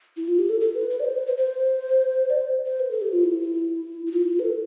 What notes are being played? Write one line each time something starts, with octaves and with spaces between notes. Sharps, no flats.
E4
F4
G4
A4
A4
B4
B4
D5
C5
B4
C5
C5
D5
C5
C5
B4
A4
G4
F4
E4
E4
F4
E4
F4
B4
A4